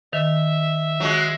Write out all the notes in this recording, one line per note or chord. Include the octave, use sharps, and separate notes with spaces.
D#3 E5
F#3 G#3 F#4